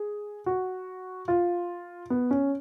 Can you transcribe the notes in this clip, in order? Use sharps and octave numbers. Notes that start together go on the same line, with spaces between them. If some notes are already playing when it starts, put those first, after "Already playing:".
Already playing: G#4
F#4
F4
B3
C#4